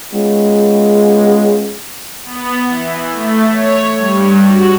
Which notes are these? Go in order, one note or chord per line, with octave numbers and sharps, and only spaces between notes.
G#3 B3 C#4 F4 G#4
B3
E3
A3
C#5
G2
F#4